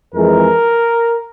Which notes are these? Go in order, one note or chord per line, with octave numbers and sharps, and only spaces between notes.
F2 E3 G#3 A#4